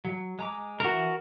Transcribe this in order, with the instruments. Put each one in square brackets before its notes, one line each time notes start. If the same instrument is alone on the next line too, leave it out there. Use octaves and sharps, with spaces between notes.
[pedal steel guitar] F#3
G#3 A#5 D6
[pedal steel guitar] E3 [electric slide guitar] F#4 A#4